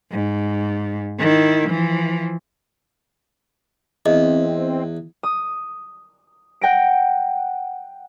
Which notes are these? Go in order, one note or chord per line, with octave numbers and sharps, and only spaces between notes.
G#2
D#3 E4
E3 F3
E2 C4 D#5
D#6
F#5 G5 A#6 D7